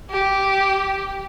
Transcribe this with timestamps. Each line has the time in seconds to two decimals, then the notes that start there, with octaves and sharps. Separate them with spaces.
0.11 G4